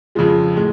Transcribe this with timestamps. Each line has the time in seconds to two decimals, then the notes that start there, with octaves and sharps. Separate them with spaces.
0.15 F2 C#3 F3 G#3
0.56 A2 G#3